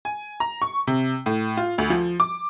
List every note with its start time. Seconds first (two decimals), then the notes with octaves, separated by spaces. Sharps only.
0.05 G#5
0.40 A#5
0.62 C#6
0.87 C3
1.26 A2
1.57 F4
1.78 D2
1.90 F3
2.20 D6